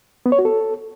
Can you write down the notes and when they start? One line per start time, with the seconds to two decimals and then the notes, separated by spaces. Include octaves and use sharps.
0.26 B3
0.32 C#5
0.39 F#4
0.45 A4